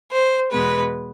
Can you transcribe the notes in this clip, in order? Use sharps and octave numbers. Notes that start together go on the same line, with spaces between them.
C5
E2 B2 G#3 B3 B4